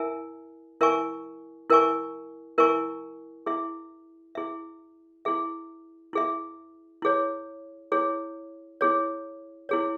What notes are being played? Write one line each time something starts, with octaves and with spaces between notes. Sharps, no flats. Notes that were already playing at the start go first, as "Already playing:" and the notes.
Already playing: E4 A#4 E5 G#5
E4 A#4 E5 G#5 C#6
E4 A#4 E5 G#5 C#6
E4 A#4 E5 G#5 C#6
E4 G#4 E5
E4 G#4 E5
E4 G#4 E5
E4 G#4 E5
E4 G#4 C#5
E4 G#4 C#5
E4 G#4 C#5
E4 G#4 C#5